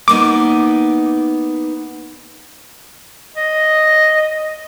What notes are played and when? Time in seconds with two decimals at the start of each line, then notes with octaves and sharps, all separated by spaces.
0.08 A#3 B3 D#4 D6
3.36 D#5